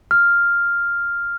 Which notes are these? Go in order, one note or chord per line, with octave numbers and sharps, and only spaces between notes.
F6